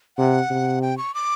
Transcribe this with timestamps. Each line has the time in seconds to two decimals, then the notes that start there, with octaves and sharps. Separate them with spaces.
0.17 C3 F#5
0.50 C3
0.82 G5
0.98 C#6
1.14 D6